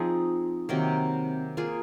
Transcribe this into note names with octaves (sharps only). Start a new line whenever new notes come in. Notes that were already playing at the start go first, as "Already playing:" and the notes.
Already playing: F3 C4 D#4 G#4
C3 D#3 F#3 A#3
A#3 F4 G#4